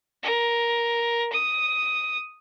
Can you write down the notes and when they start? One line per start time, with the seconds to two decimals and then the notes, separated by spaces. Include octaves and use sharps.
0.23 A#4
1.32 D#6